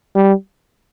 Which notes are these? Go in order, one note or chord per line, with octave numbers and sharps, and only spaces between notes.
G3